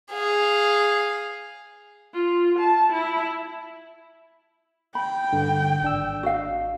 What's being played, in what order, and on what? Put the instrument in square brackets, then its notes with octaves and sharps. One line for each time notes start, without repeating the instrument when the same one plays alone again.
[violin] G#4 F5
[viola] F4
A5
E4
[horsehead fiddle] G5 [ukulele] B5
[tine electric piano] G2 D3
G#1 D4 E6
[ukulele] F#4 D#5 F5